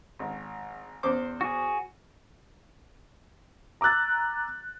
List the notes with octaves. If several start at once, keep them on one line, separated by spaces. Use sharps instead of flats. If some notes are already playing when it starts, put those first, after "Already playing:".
G#1
E2 C5 D6
F#4 G#4
A#5 D6 E6 F#6 A6